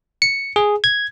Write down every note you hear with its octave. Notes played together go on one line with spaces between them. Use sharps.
C#7
G#4
G#6